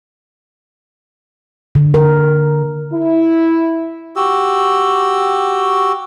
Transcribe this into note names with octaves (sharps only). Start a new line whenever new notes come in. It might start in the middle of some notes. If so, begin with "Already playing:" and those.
D3
A#4
E4
F#4 G4 E6